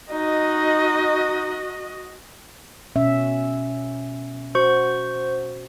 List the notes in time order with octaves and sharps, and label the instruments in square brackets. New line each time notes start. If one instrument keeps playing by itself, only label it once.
[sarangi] D#4 [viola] F#4 D#5
[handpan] B2 C#4 E5
[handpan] F#4 [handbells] C5 C#6